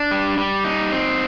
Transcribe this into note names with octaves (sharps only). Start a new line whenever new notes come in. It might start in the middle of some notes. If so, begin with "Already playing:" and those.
Already playing: D4
G3
G3
D#4
C4